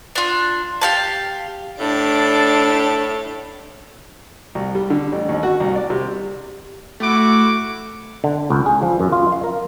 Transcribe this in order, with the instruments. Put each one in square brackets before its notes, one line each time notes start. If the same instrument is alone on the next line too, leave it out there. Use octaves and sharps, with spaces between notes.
[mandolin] D4 F4
G4 F5 A5
[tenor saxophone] A2 [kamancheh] D4 [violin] A5 D7
[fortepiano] C2
G3
D3
A1
D#2
F#4
C2
D5
C3
[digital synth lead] A3 [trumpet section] E4 F#4 D6
[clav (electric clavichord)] D3
C#2
G#4
F3
F#2
F4
F5
A#4